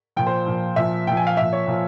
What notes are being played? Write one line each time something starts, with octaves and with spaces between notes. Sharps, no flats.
A#2 F3 G5
C5
A#2 F3
A#2 F3 E5
A#2 F3 G5
G#5
F5
A#2 F3 E5
C#5
A#2 F3